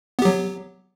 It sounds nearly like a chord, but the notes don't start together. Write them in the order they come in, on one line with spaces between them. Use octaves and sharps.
B3 G4 F#3